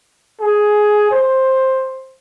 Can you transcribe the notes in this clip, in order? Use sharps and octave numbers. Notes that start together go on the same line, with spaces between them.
G#4
C5